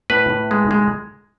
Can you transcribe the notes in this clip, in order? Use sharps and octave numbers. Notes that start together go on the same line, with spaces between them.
A2 B4
A2
G#3
G#3